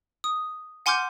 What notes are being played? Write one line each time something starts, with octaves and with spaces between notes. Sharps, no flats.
D#6
F#5 G#5 C6 D6 F6 G6